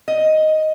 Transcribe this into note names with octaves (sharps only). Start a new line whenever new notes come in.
D#5